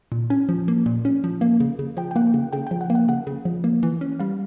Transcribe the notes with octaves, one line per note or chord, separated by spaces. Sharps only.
A#2
C#4 G#5
F3
A#3
A#2
C#4
F3
A#3
C#3
C#3
F3 G5
G5
A#3 F#5
C#3
C#3 G5
G5
F3
F#5
A#3
F#5
C#3 F#5
C#3
F3
A#3
E3
C#4
G3 F5